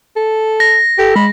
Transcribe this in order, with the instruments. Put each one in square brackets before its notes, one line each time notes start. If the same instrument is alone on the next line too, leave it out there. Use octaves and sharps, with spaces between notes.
[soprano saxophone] A4
[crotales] A#6
[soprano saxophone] G4 [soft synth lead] A4
[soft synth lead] G#3 [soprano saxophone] B5